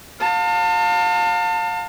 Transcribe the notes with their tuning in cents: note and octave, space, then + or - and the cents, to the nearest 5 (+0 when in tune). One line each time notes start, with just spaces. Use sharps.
F5 +25 A5 +35